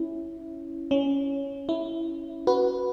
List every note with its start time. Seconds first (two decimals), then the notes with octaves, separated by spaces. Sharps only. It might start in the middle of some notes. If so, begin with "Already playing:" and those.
Already playing: C#4 E4
0.91 C#4
1.69 E4
2.47 F#4 B4